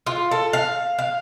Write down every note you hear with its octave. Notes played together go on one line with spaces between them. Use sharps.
F4
A4
F5
F5